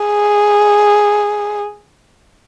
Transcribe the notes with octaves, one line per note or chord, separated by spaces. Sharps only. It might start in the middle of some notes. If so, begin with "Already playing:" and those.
Already playing: G#4